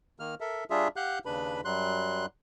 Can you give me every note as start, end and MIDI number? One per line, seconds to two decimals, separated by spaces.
0.19 0.35 51
0.19 0.35 58
0.19 0.35 89
0.41 0.64 69
0.41 0.64 70
0.41 0.64 76
0.70 0.88 55
0.70 0.88 62
0.70 0.88 65
0.70 0.88 68
0.70 0.88 76
0.96 1.19 67
0.96 1.19 77
0.96 1.19 78
0.96 1.19 90
0.96 1.19 91
1.25 1.61 39
1.25 1.61 49
1.25 1.61 62
1.25 1.61 71
1.25 1.61 83
1.65 2.26 42
1.65 2.26 54
1.65 2.26 55
1.65 2.26 84
1.65 2.26 90